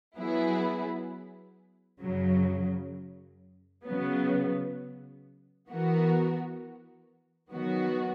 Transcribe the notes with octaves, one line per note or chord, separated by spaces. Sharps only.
F#3 B3 E4 G#4
F#2 C#3 F#3
C#3 F#3 B3
E3 B3 F#4 A#4
D#3 F#3 B3 F#4